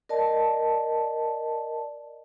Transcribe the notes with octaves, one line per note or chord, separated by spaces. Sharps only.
A#4 D5 D#5 A5